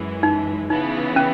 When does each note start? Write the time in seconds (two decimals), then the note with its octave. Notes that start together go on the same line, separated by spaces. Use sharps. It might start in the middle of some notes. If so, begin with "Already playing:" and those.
Already playing: F#2 E3 G#3
0.23 D#4
0.70 C#3 E3 B3 D#4
1.16 C#4